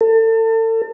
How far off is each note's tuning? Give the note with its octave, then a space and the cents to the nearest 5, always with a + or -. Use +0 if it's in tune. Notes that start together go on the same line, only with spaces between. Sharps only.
A4 +35